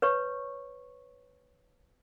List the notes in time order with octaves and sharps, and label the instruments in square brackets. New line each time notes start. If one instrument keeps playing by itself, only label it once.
[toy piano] B4 C#5 C#6